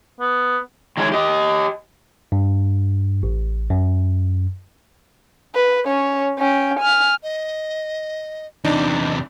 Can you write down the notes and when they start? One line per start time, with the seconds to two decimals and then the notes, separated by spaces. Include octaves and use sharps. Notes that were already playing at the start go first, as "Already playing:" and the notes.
0.20 B3
0.97 D#3 G#3 C#4 D#4 E4
1.12 G4 D#5
2.32 G2
3.23 A1
3.70 F#2
5.55 B4
5.85 C#4 C#5
6.38 C#4 G5
6.79 G#5 F6
7.23 D#5
8.65 E2 C3 D4 D#4